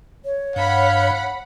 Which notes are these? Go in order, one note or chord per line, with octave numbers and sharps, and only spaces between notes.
C#5
G2 F5 F#5 B5